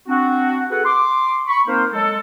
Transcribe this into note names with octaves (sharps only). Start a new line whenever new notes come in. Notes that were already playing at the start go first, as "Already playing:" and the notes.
C4 D4 F#4
F#4 G#4 A4 B4 F#5
C6 D6
B5 C#6
A#3 C4 D#4 A#4 C5
F#3 G#3 A4